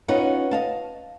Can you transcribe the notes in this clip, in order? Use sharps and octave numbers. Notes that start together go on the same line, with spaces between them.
B3 C#4 D#4 F4 F#5
D#5 F5 A5